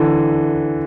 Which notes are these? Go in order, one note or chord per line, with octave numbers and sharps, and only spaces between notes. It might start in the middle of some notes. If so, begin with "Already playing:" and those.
Already playing: D3 E3